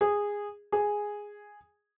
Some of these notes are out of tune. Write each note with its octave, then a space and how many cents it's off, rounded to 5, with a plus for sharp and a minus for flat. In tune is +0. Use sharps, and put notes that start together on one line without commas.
G#4 -15
G#4 -5